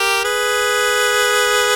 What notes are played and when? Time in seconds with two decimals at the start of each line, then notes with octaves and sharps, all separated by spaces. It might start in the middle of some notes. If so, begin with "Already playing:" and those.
Already playing: G4 A#4
0.24 G#4 B4